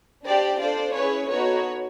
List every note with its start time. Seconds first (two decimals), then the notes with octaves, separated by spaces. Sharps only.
0.25 D4 G4 C5 D5
0.59 D4 F4 A4 C5 D5
0.94 C#4 E4 G#4 B4 C#5
1.29 B3 D#4 F#4 A4 B4 C#5